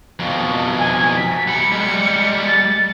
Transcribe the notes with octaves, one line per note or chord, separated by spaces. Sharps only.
F2 B2
G#5
B6
F#3 B5 C#7
G3 G#3
A6